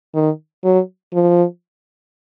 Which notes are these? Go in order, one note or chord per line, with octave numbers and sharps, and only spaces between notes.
D#3
F#3
F3